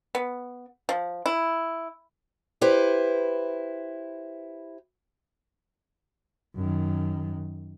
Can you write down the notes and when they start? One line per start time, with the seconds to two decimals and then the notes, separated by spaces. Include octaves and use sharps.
0.15 B3
0.89 F3
1.26 E4
2.61 E4 G4 B4 C5
6.55 F#2 D#3